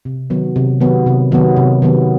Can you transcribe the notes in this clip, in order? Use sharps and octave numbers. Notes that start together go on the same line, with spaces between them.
C3
D#3 F#3 B3
C3
D#3 F#3 B3
C3
D#3 F#3 B3
C3
D#3 F#3 B3